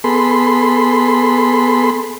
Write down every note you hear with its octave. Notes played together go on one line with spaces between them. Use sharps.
B3 G#4 A4 B5 C6